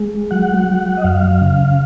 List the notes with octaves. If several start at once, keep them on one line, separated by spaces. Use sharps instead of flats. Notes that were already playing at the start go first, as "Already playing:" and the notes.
Already playing: G#3
F#3 F#5
F#3
D#5
F#2 F5
C#3